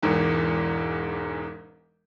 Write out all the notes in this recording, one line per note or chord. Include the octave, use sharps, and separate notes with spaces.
E1 E2 G#2 E3